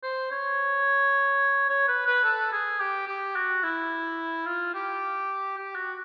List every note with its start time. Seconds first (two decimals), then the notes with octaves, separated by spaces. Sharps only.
0.03 C5
0.32 C#5
1.69 C#5
1.88 B4
2.06 B4
2.24 A4
2.53 G#4
2.80 G4
3.08 G4
3.36 F#4
3.63 E4
4.46 F4
4.74 G4
5.57 G4
5.75 F#4